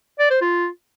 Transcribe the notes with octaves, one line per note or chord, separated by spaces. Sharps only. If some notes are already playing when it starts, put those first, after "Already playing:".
D5
C5
F4